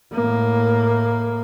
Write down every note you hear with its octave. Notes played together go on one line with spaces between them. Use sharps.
A2 A#3